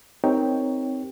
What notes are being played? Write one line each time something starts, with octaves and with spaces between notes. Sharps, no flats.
C4 D#4 G4 A#4 C#5 G5